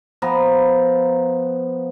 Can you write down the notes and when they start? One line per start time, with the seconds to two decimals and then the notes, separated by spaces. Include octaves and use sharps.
0.22 F3 B3 B4 A#5